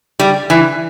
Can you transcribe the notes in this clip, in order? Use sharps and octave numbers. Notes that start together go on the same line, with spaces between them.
G3
E3